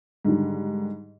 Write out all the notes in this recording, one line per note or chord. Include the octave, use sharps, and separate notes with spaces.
G#2 D3 D#3 G3